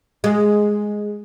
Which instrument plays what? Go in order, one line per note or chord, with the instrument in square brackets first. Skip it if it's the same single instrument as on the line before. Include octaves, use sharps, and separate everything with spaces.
[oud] G#3